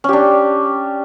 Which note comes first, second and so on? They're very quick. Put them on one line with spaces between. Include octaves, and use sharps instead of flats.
C#4 G4 D4